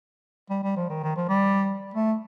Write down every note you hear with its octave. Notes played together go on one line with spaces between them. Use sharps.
G3
G3
F3
D#3
D#3
F3
G3
A3